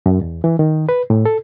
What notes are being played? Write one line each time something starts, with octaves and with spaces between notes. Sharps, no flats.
F#2
E2
E3
D#3
B4
A2
A4